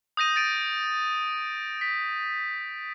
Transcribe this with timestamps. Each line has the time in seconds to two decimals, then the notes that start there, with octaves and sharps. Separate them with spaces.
0.17 D#6 G6 A#6 D#7
0.36 A6 D7 D#7
1.81 B6